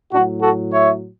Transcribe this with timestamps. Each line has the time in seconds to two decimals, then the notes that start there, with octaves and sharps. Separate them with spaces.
0.12 A2 F#3 D4 F#4
0.42 F#4 A4
0.72 C#5 E5